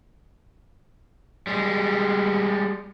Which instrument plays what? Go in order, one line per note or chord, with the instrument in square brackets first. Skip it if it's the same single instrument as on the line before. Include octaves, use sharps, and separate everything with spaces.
[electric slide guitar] G3 G#3